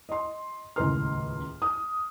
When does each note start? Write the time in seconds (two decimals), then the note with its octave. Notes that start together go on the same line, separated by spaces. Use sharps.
0.09 D#5 C6
0.76 D#1 C#2 A2 A#4 C6 F6
1.62 D#6